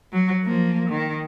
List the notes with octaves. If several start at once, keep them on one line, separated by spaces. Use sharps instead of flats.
F#3
F3 A#3
D#3